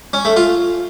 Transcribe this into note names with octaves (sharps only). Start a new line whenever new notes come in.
C#4
A3
F4